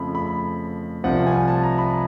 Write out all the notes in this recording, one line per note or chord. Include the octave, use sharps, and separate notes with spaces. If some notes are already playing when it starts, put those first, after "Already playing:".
Already playing: F2 C#3 F3 A3 B5
B5
C2 C3 F3 F#5
G#5
A5
A#5
B5